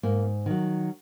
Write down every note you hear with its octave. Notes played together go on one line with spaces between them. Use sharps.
G#2 A#3
D#3 F#3